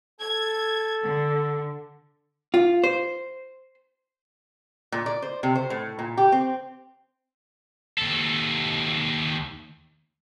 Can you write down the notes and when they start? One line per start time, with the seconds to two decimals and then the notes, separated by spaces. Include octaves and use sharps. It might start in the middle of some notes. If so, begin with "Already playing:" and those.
0.20 A4 G#6
1.03 D3
2.54 F4
2.84 C5
4.92 A#2
5.06 D5
5.22 C5
5.43 C3
5.55 C5
5.70 A2
5.99 A#2
6.17 G4
6.32 C4
7.98 D#2 A4